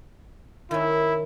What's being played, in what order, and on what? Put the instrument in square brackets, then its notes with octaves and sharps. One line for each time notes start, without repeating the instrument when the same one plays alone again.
[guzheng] D#3 C#4 [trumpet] E4